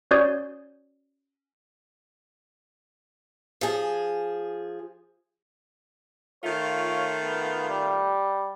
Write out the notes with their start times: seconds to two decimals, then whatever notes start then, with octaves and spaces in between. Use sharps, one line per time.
0.11 C#4 F#4 C#5 D5 D#6 G6
3.61 F3 G#4
6.44 D#3 A3 F4 C#5
7.23 B3
7.69 G3